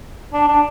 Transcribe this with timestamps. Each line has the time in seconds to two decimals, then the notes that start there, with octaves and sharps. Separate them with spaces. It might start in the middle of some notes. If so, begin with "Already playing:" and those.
0.33 D4
0.48 D4